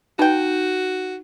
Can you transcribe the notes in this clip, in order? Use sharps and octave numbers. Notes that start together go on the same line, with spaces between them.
D#4 F#4 B4 G5